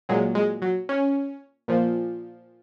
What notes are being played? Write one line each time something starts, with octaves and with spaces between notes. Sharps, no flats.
A#2 F#3 G#3
G#3
F#3
C#4
A#2 F3